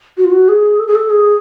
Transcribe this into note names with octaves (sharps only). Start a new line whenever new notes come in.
F#4
F4
F#4
G#4
A4
G#4
A4
G#4